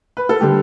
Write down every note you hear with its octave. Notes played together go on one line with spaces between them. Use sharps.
B4
A4
D3 G3 G4